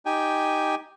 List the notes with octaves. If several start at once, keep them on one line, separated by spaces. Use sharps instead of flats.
D#4 G4 G5 G#5